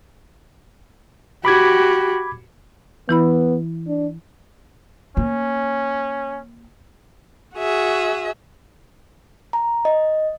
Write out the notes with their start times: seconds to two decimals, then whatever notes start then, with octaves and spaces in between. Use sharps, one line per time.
1.45 F#4 G4 B5 D6 G#6
3.09 E3 B3 E4 B5
3.88 D4
5.17 A#3 C#4
7.55 F#4 G#4 E5
9.53 A#5
9.85 D#5